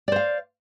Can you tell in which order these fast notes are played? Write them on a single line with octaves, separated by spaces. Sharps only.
D5 C5 F5